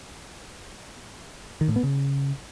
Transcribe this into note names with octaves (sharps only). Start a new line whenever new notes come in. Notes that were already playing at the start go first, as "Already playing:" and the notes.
D#3
A2
B3
C#3